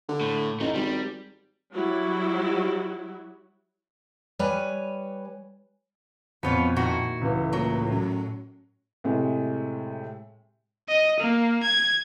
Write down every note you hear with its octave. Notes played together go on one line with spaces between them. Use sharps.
D3
A2
A1 A3 D#4
G#1 G3
F#3 G3 E4 F#4
G3 B4 C#5 G#5
F2 B2 B3 F4 C#5
A#2 D#3 E4 F#4
C#2 A2 E3
A#2 F#3
F#2
A2 C3 G#3
D#5
A#3
G#6